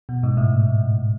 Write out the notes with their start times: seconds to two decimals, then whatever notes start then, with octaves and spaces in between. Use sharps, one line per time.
0.09 B2
0.23 G#2
0.37 A2